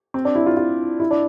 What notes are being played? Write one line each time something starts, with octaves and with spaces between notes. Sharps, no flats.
C4
D4
E4
F4
F4
E4
D4